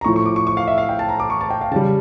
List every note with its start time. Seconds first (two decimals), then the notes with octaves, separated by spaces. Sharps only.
0.01 A#5
0.04 A2 F3 C#6
0.16 C#6
0.26 D6
0.36 C#6
0.47 C#6
0.57 F5
0.68 E5
0.78 F5
0.89 G5
0.99 A5
1.09 A#5
1.20 D6
1.30 C#6
1.41 A5
1.51 G5
1.61 F5
1.71 C#3 A5
1.76 G3